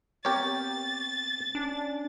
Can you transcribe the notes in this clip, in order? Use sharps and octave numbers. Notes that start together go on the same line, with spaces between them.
B3 C4 G4 A#4 C#5 A6
C#4 D4